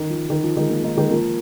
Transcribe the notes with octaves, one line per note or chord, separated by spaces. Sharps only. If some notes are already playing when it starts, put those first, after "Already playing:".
Already playing: D#3
F3
D#3
F3
D#3 G#3
F3 A#3
A#3 D#4
D#3 G#3
F3 A#3